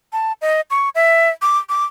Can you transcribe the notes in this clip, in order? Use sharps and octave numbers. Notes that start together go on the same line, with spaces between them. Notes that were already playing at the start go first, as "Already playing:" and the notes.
A5
D#5
C#6
E5
D6
D6